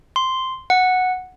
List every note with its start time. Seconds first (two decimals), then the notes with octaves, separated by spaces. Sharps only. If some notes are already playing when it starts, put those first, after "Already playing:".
0.16 C6
0.70 F#5